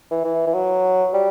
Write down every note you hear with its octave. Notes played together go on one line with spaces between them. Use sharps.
E3
E3
E3
F#3
G3